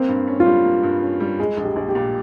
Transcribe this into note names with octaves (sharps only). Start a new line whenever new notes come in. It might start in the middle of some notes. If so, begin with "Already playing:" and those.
Already playing: A#3 C4
G2
C#4
F4
G3
A#3
G2
C#4
G3
G#3 G#4
A#1
G4
A#1
G4
A#2